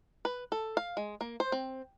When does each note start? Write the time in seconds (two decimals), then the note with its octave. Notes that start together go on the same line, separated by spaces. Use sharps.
0.25 B4
0.52 A4
0.77 F5
0.97 G#3
1.21 A#3
1.40 C5
1.52 C4